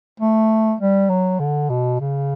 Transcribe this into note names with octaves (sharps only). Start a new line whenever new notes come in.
A3
G3
F#3
D3
B2
C#3